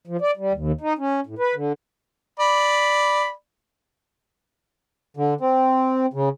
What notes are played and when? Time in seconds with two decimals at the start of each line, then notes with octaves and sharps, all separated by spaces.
0.07 F3
0.21 D5
0.37 G3
0.53 D#2
0.81 D#4
0.99 C#4
1.27 A2
1.39 B4
1.55 D3
2.40 D5 B5
5.17 D3
5.41 C4
6.13 C#3